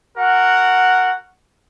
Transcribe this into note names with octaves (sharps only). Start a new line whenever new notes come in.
F#4 A#4 F#5